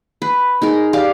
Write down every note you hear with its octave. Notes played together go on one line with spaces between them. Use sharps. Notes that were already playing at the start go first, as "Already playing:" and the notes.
B4
D#4 G#4 A#4
G4 D5 F5 D6